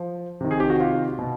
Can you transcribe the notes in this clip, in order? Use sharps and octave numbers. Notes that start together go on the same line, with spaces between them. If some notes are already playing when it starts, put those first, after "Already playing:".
Already playing: F3
C3 D#3
G#4
G4
F#4
F4
B2